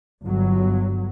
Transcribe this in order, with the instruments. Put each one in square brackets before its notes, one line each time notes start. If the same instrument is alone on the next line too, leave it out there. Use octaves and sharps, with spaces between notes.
[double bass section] G1 F#3